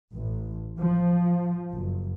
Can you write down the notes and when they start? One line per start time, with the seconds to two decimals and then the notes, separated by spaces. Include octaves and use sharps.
0.13 A1
0.79 F3
1.73 F#1